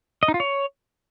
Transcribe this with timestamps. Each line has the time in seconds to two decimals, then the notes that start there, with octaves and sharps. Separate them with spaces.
0.23 D#5
0.28 D#4
0.34 F4
0.40 C#5